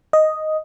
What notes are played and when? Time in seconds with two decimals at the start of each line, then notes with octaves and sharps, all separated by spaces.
0.13 D#5